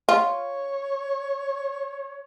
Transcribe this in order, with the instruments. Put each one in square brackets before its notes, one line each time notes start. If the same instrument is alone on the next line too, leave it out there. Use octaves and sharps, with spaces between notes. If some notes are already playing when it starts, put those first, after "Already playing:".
[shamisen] F4 [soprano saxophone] C#5